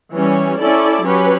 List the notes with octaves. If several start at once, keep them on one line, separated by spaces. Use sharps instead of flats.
E3 G3 C#4
C#4 E4 A4 D5
F#3 C#4 G4 B4